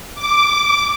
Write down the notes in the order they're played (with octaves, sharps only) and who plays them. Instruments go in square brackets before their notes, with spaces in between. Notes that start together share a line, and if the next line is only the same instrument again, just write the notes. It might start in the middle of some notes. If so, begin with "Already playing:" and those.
[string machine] D6